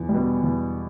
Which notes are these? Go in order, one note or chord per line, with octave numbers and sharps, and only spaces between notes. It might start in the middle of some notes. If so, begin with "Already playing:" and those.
Already playing: E2
G3
B2
E2